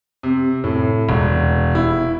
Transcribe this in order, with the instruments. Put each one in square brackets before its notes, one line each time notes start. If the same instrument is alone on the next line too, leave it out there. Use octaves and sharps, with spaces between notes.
[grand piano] C3
A2
E1
E4